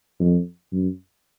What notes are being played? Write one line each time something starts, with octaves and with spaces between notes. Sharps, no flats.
F2
F#2